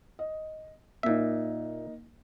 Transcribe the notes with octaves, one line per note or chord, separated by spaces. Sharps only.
D#5
A#2 A#3 D#4 E5